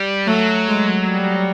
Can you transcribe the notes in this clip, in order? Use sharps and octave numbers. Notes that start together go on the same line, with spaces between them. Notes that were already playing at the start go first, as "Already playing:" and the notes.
Already playing: G3
F#3 A3
G#3
G3